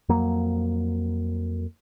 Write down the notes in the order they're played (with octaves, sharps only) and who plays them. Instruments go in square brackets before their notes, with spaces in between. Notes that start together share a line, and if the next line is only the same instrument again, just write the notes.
[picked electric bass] F2 F#3 A#3